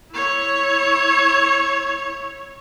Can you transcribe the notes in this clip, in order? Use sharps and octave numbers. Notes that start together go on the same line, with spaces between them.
E4 C#5